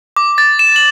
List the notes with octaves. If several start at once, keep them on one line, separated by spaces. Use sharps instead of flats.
D6
A6
E7
F#7